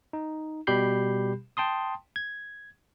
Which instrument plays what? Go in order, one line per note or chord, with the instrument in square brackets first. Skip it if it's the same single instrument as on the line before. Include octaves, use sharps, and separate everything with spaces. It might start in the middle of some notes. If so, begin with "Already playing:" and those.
[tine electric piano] D#4
B2 G3 G4 B5 G6 C7
G5 A5 C6 D#6
G#6